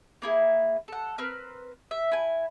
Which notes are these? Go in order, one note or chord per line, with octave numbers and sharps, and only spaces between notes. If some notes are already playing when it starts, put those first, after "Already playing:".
A#3 E4 G#4
A4 F#5
C4 A#4 B4 F6
E5
E4 G#5